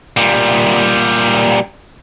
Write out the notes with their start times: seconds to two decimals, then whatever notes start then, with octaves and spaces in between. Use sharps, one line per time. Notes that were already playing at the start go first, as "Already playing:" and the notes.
0.17 A#2 G3